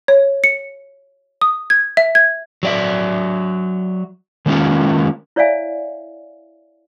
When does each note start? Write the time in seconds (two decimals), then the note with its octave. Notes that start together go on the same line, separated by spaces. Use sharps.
0.08 C#5
0.44 C#7
1.41 D#6
1.70 G#6
1.97 E5
2.15 G#6
2.63 F#3 D5 E5
4.46 D#3 G#3 A#3 C#4 F4
5.36 E4 C#5 D5 E5 F5 G#5